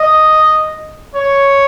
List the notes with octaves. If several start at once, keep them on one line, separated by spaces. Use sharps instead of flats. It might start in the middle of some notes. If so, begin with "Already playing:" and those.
Already playing: D#5
C#5